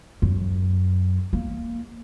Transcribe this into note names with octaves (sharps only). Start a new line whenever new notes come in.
F#2
A#3